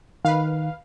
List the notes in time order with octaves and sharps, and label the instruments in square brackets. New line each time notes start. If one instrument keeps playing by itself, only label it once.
[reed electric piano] D#3 [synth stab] B4 F5